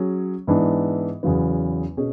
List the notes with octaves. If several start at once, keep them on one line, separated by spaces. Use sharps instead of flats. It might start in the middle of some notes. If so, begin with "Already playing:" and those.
Already playing: F#3 C#4 G#4
G#2 E3 B3 D4
E2 C#3 F#3 B3
B2 C#4 G#4